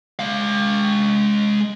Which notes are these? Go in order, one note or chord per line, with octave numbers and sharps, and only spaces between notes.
G#3 F5